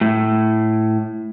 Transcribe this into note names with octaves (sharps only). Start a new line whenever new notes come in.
A2